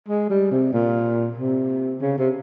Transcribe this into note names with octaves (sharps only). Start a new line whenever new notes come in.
G#3
G3
C3
A#2
C3
C#3
C3